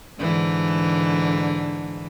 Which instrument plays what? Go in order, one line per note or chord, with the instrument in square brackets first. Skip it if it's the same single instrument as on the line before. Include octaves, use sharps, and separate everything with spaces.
[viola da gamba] G#2 D3 E3